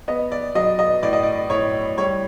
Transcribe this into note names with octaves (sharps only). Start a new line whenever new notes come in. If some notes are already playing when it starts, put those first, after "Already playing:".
B3 D#5
D5
F#3 D#5
D#5
A2 D5
D#5
D5
A2 C#5
G3 C#5